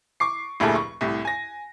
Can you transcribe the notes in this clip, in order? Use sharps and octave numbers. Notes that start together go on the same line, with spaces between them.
C#6 D6 C7
F1 D2 A#2 E4 G#4 A4
C#6
C2 A2
G#5 A#6